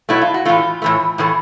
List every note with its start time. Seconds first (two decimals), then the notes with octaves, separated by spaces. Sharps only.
0.09 B2 F#3 A3 E4
0.21 F4
0.34 F#4
0.45 A2 E3 A3 F4
0.82 A2 E3 A3
1.18 A2 E3 A3